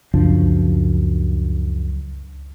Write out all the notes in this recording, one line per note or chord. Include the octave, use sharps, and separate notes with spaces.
C#2 F#2 F3 D4